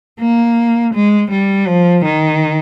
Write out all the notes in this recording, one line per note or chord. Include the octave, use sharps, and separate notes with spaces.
A#3
G#3
G3
F3
D#3